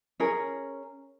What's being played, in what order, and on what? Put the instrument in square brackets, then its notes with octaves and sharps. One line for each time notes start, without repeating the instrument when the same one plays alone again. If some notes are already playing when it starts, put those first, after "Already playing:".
[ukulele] C#4 G#4 A#4